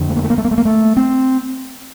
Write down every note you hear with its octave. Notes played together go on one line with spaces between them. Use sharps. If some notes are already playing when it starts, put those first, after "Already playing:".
Already playing: F2 D3
A3
A#3
A3
A#3
A3
A#3
A3
A#3
A3
C4